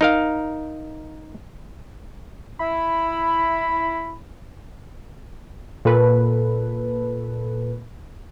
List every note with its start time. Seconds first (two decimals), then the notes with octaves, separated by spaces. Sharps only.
0.01 D#4 A#4 F5
2.60 E4 B5
5.85 A#2 A4 B4